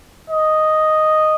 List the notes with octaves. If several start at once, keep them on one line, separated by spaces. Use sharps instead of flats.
D#5